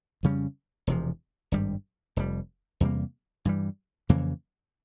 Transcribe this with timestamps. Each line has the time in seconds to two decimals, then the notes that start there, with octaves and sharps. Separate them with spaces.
0.23 F2 C#3 G3 C#4
0.87 E1 E2 C3 F3
1.52 G#1 G2 G3
2.16 F1 F2 C3 G3
2.80 E2 C3 G3 A#3
3.45 G2 E3 G3
4.09 F2 C#3 E3 A#3